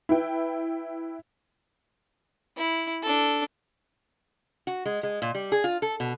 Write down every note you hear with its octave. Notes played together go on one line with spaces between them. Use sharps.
E4 B4 G5
E4
D4 A4
F#4
G#3
G#3
A#2
G3
G#4
F4
A4
B2